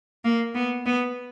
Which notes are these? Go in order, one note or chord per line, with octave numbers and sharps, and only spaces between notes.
A#3
B3
B3